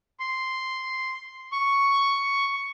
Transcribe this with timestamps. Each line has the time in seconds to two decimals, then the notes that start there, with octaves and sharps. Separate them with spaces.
0.20 C6
1.52 C#6